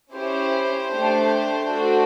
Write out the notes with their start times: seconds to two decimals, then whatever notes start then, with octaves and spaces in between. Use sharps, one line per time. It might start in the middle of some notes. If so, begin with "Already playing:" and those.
0.14 C#4 E4 G4 C5
0.88 A3 D4 G4
1.64 A3 D4 F#4 A4